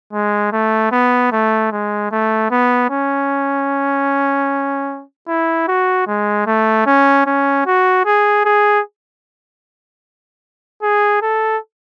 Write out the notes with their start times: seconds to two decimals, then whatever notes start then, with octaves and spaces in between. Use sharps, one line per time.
0.13 G#3
0.52 A3
0.92 B3
1.32 A3
1.72 G#3
2.11 A3
2.51 B3
2.90 C#4
5.28 E4
5.68 F#4
6.07 G#3
6.46 A3
6.86 C#4
7.26 C#4
7.66 F#4
8.06 G#4
8.45 G#4
10.82 G#4
11.22 A4